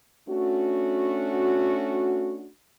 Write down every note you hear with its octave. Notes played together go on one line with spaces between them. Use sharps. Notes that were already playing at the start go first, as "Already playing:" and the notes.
A3 C#4 D4 F#4